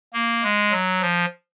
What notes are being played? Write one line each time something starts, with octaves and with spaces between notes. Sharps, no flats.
A#3
G#3
F#3
F3